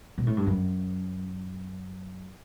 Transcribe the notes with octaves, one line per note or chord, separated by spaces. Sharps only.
B2
A2
G2
F#2